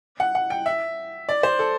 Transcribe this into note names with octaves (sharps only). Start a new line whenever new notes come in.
F#5
F#5
G5
E5
D5
C5
A4